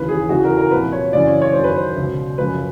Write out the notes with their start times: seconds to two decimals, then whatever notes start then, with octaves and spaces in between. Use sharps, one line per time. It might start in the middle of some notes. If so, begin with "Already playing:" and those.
Already playing: D#2 C#3 E3 B4
0.09 G#4
0.29 E2 C#3 E3 F#4
0.44 A#4
0.57 A#4
0.71 C2 A#2 F3 B4
0.92 C#5
1.13 F#2 C#3 E3 D5
1.27 C#5
1.42 C#5
1.52 F#2 D#3 C5
1.64 B4
1.76 C5
1.96 C#2 B2
2.38 F#2 C#3 F3 B4